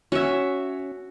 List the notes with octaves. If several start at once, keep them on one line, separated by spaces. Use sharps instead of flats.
C#4 F#4 C#5 E5